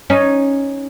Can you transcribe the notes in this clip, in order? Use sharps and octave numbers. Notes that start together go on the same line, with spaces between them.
C#4 D#4